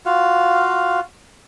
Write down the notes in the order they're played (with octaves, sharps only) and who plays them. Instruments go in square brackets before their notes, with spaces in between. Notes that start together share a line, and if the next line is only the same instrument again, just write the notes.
[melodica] F4 F#4 F5